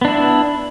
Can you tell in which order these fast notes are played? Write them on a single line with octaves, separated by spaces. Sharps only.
B3 D4 E4